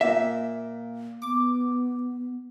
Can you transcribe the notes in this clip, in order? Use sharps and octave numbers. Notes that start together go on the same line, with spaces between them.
A#2 E5
B3 D6